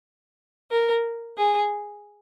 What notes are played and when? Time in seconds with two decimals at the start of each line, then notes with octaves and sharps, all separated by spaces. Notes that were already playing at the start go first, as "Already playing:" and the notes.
0.71 A#4
1.37 G#4